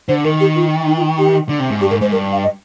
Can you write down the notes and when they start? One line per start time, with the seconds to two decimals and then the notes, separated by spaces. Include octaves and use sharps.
0.08 D3 C5
0.24 D#3 A#4
0.40 G4
0.56 F4
0.87 D#4
0.97 F4
1.18 G4
1.49 D3
1.60 C3
1.70 G#2
1.81 G2 G4
1.91 G#2 A#4
2.01 G#2 C5
2.12 G2 A#4
2.32 F5
2.43 D#5